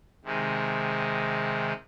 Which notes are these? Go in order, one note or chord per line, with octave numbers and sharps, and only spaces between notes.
C3 D#3 G#3